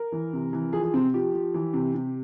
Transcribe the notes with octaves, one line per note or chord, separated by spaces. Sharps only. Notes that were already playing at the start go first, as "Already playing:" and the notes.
Already playing: A#4
E3
C3
E3
F3 G#4
G#4
C3 C4
F3 G4
F3
E3
C3
C3